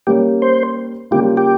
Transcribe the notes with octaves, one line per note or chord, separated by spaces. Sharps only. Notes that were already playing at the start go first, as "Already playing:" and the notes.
G3 A#3 C#4 G4
C5
C#3 G3 A#3 F4 G4
G4